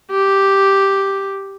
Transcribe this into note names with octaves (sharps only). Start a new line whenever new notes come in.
G4